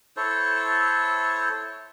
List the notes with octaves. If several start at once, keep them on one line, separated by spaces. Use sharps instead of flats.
E4 A4 C5 C#5